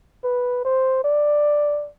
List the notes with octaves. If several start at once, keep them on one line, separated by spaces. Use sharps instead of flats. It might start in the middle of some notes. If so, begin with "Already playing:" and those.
B4
C5
D5